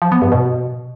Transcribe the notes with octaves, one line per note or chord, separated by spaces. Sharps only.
F3
B3
G2
B2